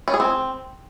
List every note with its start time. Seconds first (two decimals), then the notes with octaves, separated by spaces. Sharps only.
0.08 C#4
0.14 G#4
0.20 C4